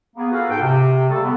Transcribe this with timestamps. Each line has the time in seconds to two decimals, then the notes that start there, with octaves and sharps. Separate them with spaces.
0.16 A#3 B3 G#4
0.32 F4 F#4 G#4 A4 B4 F5
0.50 G#2 A4 G5
0.61 C3
1.09 C#3 G3 A3 A4
1.23 B3